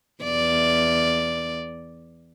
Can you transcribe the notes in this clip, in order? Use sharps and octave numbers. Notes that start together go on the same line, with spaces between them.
E2 D5